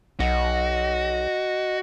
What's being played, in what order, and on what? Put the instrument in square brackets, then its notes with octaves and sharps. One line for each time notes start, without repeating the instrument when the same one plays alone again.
[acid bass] B1 [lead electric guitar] F#4 [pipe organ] D#5